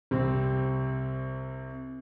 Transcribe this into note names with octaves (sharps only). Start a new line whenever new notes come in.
C2 G3 C4